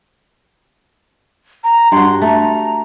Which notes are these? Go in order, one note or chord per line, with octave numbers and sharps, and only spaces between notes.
A#5
G2 F#4 C6
A3 A#5